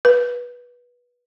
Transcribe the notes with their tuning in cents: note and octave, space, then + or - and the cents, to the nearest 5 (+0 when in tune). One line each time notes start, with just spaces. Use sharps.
B4 -20